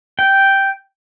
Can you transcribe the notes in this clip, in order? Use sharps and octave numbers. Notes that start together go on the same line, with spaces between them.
G5